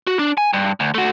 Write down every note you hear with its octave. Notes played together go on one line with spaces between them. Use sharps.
F#4
D4
G#5
G2
D2
A3 F#4